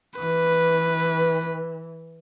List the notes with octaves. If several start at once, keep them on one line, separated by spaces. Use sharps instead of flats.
E3 B4